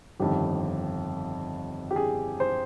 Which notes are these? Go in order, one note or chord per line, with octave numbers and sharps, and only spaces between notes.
G1 F2 D#3 G4
G4
G#4
C5